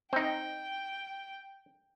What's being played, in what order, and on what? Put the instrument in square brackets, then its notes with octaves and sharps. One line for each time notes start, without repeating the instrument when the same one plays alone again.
[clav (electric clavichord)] C4 D#4 [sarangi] G5